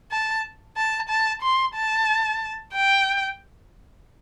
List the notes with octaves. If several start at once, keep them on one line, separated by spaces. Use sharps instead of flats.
A5
A5
A5
C6
A5
G5